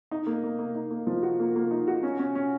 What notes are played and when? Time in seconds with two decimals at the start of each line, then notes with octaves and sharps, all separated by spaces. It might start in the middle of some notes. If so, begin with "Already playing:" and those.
0.11 D#4
0.27 A#3
0.44 A#3
0.59 A#3
0.75 D#4
0.91 A#3
1.07 F3
1.23 F#4
1.40 A#3
1.56 A#3
1.71 D#4
1.88 F#4
2.03 C#4
2.19 C#4
2.35 C#4